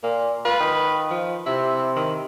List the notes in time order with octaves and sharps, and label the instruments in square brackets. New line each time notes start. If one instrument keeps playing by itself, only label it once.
[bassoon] A#2 [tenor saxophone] A#3
[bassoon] F4 [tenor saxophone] B4
[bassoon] D#3
[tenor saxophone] F3
[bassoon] C3 [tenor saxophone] E4
[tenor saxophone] D#3